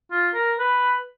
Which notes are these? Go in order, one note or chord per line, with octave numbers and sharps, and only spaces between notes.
F4
A#4
B4